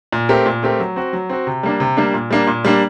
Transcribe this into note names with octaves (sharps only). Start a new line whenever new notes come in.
A#2
A3 C4 G4 A#4
A#2
A3 C4 G4 A#4
F#3
C4 F#4
F#3
C4 F#4
C3
G3 A#3 D4
C3
G3 A#3 D4
A#2
G3 A#3 D4
A#2
G3 A#3 D4